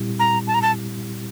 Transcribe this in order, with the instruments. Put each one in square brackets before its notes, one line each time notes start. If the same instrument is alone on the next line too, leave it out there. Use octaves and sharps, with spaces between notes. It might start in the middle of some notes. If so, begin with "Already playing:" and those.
Already playing: [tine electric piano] A#2 G3 C4 E4 G4
[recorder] A#5
A5
A#5
A5